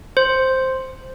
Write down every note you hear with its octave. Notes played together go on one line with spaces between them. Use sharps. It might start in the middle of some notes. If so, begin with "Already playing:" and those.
C5